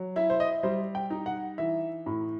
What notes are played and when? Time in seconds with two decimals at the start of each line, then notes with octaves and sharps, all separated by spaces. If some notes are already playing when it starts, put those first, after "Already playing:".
Already playing: F#3
0.16 E4 E5
0.30 C5
0.40 D#5
0.63 G3 C5
0.95 G5
1.10 D#4
1.26 F#5
1.58 E3 E5
2.06 A2